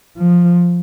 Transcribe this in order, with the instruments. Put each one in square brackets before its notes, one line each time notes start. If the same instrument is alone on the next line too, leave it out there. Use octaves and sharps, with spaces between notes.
[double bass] F3